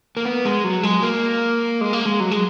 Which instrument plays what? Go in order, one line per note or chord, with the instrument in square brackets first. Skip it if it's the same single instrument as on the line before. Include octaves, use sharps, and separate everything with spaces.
[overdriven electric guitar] A#3
B3
G#3
F#3
G#3
A#3
G#3
A#3
G#3
F#3
G#3